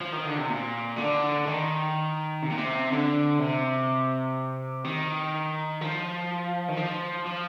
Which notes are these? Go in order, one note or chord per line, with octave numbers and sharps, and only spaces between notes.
F3
D#3
D3
C3
A#2
D3
D#3
C3
A#2
C3
D3
C3
D#3
F3
D#3
F3
F3